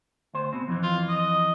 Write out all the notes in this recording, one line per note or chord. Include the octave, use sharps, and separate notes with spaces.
D2 C5
B2 C4
F2 E3
F4
D#5